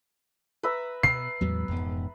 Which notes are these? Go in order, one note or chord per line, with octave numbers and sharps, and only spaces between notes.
B4 E5 A#5
B2 C7
E2 A2 F#3 G#3 B3
E1 F2 G#2 B3